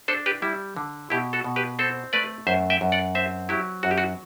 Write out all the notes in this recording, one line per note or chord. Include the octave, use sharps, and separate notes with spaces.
D4 A4 C5
G4 B4
G3 E4
D3
B2 E4 G4
F#4 A4
B2
G4 B4
C4 A4 C5
A3 B4 D5
F#2 C5 E5
E5 G5
F#2
D5 F#5
C4 C5 E5
F#3 E4 G4
F#2 F#4
G4
F#4